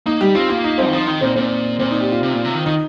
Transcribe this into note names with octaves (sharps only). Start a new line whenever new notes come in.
A#3 D#4
G3 G4
C4 F4
A#3 F4
D#4
C4
D#3
F3 D#4
D#3 D#4
A#2 C4
A#2 C4
A#2 C4
D#4
G4
F4
C3
A#2
C3
D#3
D#3 D#4